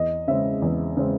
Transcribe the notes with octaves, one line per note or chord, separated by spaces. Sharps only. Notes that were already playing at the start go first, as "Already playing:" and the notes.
Already playing: E2 D#5
C#3 G#3 C4 E5
E2
C#3 G#3 C4